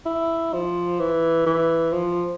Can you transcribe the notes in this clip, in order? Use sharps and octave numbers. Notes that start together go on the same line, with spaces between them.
E4
F3
E3
E3
F3